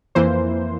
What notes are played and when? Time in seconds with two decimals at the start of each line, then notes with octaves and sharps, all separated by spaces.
0.15 F2 E3 A#3 C5